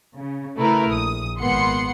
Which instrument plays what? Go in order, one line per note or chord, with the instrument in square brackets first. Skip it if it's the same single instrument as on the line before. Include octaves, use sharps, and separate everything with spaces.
[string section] C#3
C#3 A3 E4 A#4 B4
A#1 D#6
G#1 A#3 B3 F#5 C6 C#7